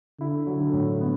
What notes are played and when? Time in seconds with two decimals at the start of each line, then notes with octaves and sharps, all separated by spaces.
0.20 D3 E4
0.46 F#3
0.60 D3
0.73 A2
1.00 B3